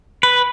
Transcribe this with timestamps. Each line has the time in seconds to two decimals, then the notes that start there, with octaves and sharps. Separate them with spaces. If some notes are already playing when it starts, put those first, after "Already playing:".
0.23 B4